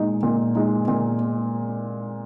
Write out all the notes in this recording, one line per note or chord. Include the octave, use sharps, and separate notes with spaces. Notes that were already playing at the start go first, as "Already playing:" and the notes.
Already playing: A#2 G#3 D#4
A#2
G#3 D#4
A#2